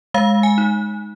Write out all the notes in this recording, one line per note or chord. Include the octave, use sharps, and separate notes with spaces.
G#3 F5
G#5
D#4